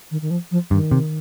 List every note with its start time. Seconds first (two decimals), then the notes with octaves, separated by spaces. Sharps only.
0.11 D#3
0.22 D#3
0.30 F3
0.51 F3
0.71 G2 D#3
0.91 C3